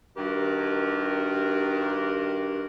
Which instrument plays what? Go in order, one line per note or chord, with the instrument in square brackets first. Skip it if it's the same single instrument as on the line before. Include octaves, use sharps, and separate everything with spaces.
[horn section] G2 D#3 F#4 G4 A#4